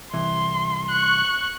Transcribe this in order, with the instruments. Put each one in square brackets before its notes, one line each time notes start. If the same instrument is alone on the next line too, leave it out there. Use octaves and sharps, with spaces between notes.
[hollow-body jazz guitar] C2 E3 [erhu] C6
[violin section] C#6 F#6